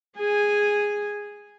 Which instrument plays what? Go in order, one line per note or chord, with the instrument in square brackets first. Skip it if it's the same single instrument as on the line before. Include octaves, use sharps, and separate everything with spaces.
[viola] G#4 G#5